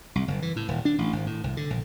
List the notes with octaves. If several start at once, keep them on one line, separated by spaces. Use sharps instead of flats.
C2
F#1
E3
A2
D#1
D4
A1
G#1
A2
C2
D3
A#1